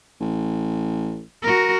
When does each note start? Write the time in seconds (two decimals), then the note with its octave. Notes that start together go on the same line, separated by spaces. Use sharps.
0.20 A1
1.42 F#4 A#4